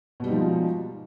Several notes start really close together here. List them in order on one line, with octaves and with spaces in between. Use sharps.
B2 G3 D#4 F3 G#3